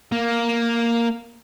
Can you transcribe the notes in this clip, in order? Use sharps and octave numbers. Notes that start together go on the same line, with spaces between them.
A#3